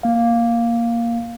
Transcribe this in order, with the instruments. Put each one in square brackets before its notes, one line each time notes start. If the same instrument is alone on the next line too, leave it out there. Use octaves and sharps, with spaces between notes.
[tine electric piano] A#3 F5